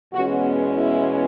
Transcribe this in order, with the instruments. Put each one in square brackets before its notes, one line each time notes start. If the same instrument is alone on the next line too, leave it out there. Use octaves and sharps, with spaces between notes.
[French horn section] E2 B2 G#3 C#4 F#4
E4